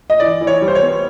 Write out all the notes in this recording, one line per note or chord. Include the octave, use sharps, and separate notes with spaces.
D#5
E3 D5
E3
C#5
G3
C5
C#5
B3